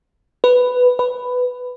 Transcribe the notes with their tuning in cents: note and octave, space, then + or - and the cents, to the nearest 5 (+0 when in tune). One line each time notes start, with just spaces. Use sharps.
B4 +5
B4 +10